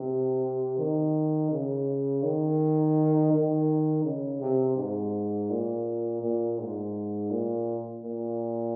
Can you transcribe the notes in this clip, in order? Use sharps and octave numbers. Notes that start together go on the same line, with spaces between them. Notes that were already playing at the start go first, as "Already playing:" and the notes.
Already playing: C3
D#3
C#3
D#3
D#3
C#3
C3
G#2
A#2
A#2
G#2
A#2
A#2